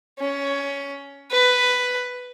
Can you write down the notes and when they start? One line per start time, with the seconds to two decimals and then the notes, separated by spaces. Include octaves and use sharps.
0.20 C#4
1.31 B4